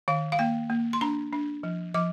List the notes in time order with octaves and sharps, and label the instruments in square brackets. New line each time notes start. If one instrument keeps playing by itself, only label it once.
[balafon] D#3 F5
F5
A#3 G5
A#3
C6
D4 A#5
D4
F3
F3 D6